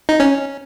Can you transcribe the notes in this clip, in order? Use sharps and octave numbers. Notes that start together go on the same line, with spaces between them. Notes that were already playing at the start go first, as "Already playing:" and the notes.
D#4
C#4